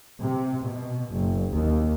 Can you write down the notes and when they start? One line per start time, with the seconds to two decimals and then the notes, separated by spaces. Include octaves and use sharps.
0.22 C3
0.63 B2
1.10 F#1
1.52 D#2